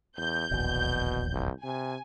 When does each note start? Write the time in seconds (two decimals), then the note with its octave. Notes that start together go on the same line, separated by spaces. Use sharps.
0.17 E2 G6
0.51 E1 A#1 D#2 B2
1.33 C2
1.64 C3 G#5